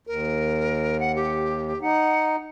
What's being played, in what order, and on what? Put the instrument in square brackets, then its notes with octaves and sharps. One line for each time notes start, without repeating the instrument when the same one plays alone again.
[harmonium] D#2 [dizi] A#4
[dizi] F#5
G4
[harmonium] D#4 [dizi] F#5